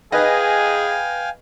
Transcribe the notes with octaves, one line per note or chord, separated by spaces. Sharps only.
G#4 B4 D#5 F5 G5 G#5